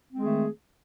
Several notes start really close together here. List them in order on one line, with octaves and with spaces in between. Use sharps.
C4 G#3 G#4 D#3 A3